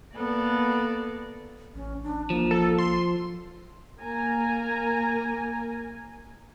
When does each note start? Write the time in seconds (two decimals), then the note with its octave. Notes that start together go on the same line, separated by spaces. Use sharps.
0.14 A#3 B3 A4 D5
1.75 A1 C#4
2.03 D4
2.30 F3 A#3
2.51 A4
2.78 C6
4.02 A#3 A#4 G#5 A#5